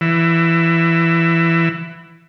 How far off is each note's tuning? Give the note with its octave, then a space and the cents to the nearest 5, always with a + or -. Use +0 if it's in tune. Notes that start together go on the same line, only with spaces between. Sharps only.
E3 +15